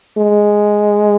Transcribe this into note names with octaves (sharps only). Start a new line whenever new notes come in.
G#3